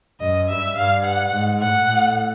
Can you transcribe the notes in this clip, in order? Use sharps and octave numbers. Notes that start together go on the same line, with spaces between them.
F#2 D#5
G2 E5
G2 F5
F#5
G#2
A2 F#5
A2